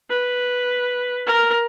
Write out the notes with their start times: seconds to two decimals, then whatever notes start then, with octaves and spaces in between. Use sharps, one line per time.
0.10 B4
1.26 A#4